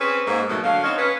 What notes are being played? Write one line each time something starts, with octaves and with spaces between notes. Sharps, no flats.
C4 C#4 G#4 B4
G#2 A#3
B2 F#3 A3 D#4
D3 F#3 F5
C4 C#4 D#4
C#4 B4